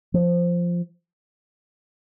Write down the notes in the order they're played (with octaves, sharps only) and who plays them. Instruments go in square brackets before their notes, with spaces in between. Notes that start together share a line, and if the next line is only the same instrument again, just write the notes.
[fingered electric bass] F3